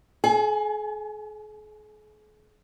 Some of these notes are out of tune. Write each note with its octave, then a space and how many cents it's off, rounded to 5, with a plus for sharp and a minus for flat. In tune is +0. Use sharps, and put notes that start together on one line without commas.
G#4 +45 G#5 +0